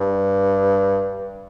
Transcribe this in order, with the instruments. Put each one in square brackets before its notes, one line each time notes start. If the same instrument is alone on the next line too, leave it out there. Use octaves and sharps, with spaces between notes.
[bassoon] G2